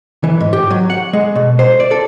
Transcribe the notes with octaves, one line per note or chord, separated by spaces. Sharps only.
E3
G#2
G4
F#3
F#5
G#3
B2
C5
D5
A4